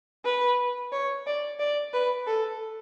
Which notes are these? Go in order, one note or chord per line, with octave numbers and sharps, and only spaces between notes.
B4
C#5
D5
D5
B4
A4